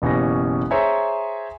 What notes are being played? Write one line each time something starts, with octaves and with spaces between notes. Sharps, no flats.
F#1 B2 E3 C#4 G4 A#6
G#4 C5 C#5 E5 G#5 A#5